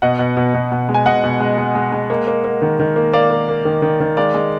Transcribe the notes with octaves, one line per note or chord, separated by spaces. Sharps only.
B2 D#5 F#5
B2
B2
B2
B2
G#3
G#5
B2 D#5 F#5
B2
G#3
G#3
G#3
G#3
A#3
A#3
A#3
D#3
D#3
A#3
A#3 D5 F5
A#3
A#3
D#3
D#3
D#3
G#3 D5 F5
G#3